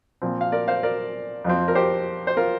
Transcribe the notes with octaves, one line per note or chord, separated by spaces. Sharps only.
A#2 F3 C4
F5
A#4 D5
C5 F5
A#4 D5
F2 F3 C4
A#4
G4 C5
C5
F4 A#4